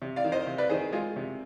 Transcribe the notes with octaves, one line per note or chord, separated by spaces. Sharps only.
C3
D5 F5
D#3
C5 D#5
C3
B4 D5
D#3 G#4 C5
G#3 F4 G#4
C3